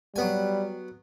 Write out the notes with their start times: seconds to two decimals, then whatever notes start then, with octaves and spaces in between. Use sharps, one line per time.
0.16 F#3 G3 B3 G#5